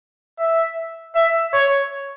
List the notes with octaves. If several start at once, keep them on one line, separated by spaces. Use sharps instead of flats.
E5
E5
C#5